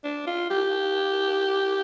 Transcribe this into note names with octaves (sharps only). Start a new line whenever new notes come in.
D4
F4
G4